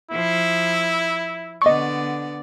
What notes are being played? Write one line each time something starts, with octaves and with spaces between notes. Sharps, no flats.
F3 E4
D3 B3 D5 D#5 C#6